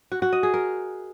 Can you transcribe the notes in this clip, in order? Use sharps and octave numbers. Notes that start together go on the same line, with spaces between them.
F#4
F#4
D#5
G#4
A#4